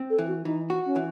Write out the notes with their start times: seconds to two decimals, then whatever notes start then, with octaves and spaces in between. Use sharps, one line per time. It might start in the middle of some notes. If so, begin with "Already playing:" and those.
Already playing: C4
0.10 A4
0.19 E3
0.27 F#4
0.44 E3 D#4
0.70 F#4
0.86 C#4
0.96 E3